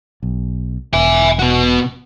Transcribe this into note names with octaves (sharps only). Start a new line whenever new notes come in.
B1
E1 E5 G#5
B2 F#4